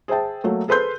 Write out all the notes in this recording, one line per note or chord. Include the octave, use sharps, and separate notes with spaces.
G#4 C5 E5 G5 A5
F#3 A3 A#3
G#4 A4 B4 C5 C6 G6